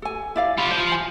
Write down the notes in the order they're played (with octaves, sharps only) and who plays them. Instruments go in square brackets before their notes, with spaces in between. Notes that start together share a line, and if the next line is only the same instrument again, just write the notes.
[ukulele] A4 G#5
E4 D5 F5
[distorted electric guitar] F4 G4 [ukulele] B5
[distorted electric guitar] F3 C5
[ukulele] G#5